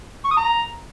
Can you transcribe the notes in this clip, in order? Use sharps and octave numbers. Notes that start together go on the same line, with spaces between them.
C#6
D#6
A#5